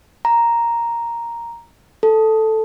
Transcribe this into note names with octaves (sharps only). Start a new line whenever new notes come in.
A#5
A4